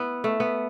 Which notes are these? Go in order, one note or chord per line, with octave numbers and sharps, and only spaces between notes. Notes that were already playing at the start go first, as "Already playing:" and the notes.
Already playing: B3 E4
A3
B3